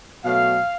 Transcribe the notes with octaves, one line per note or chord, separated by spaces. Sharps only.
B2 F#3 A3 F5